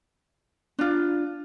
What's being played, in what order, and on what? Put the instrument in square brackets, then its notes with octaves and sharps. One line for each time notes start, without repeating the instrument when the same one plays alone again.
[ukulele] D4 F4